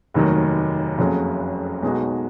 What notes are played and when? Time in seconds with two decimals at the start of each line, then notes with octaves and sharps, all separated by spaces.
0.14 F1 D#2 D#3 F#3
0.98 F#1 F2 C#3 F#3
1.83 B1 B2 G#3 D#4 F#4